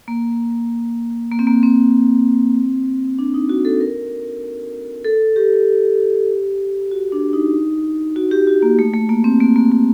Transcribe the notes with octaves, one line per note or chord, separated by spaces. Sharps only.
A#3
A#3
C4
A#3
C4
D4
D#4
F#4
A4
A#4
A4
G4
F#4
D4
D#4
F#4
G4
F#4
A#3
A3
A3
A#3
C4
A#3
A#3
A#3